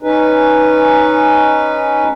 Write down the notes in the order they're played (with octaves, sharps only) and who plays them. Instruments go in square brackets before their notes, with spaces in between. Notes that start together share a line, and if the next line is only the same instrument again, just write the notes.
[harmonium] C#4 D#4 B4